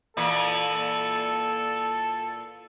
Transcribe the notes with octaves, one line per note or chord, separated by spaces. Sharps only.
A#2 E3 A4 B4